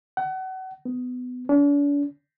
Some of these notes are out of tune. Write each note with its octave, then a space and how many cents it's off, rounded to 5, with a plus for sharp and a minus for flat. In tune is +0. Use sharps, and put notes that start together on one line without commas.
F#5 +30
B3 +20
D4 -45